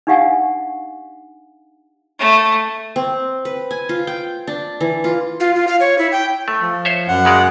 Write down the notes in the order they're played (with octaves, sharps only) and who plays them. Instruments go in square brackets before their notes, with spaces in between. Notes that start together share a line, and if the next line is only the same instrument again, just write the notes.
[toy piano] D4 D#4 G4 F5 F#5 G#5
[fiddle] A3
[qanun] C4
B4
G#5
F4
G5
D4
E3
F4
[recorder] F4
F4
F5
C#5
E4
G5
[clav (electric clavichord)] A3
[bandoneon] F3
[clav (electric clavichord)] C5 C#5 E5
[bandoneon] F#2 F#5
[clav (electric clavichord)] C#3 G#3 D5